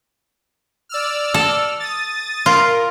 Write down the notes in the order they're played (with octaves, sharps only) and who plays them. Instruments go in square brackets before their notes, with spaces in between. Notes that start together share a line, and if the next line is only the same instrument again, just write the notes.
[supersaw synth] D5 E6 F6
[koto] A4
[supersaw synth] D#6 A6
[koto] F4 [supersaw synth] A#4